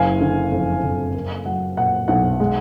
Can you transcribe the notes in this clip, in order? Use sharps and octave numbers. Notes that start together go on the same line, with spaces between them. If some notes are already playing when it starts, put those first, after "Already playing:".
Already playing: F#1 F5 G#5
D3
F2
F#1
A#3
F#3 F#5
A#2 F#5
B1 F#5
G#3